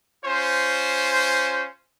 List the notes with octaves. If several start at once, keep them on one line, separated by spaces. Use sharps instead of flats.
C#4 F4 C5